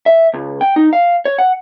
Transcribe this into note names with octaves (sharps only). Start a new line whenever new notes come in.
E5
C#2
G5
D#4
F5
C#5
F#5